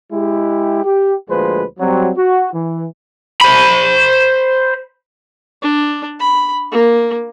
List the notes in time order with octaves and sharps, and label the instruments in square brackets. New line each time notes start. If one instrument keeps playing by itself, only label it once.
[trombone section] G#3 E4 G4
G4
D2 A#2 F3 G#3 B4 C5
F#3 G3 C4
F#4
E3
[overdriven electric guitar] C5 B5
[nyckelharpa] D4
B5
A#3